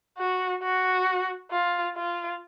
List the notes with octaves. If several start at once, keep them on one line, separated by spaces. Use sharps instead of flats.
F#4
F#4
F4
F4